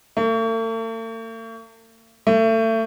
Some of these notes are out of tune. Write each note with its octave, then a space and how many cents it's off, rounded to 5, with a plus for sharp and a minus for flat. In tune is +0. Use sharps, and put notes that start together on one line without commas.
A3 +45
A3 +30